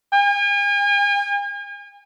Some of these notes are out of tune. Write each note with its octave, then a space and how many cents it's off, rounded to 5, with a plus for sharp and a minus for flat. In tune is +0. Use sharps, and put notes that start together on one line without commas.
G#5 -40